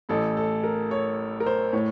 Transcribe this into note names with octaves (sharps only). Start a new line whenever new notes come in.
A1 A2 A4
A4
A#4
C#5
A#4
C5
A2 C#5